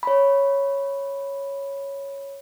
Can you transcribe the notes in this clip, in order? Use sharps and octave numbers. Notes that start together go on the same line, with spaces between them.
C#5 B5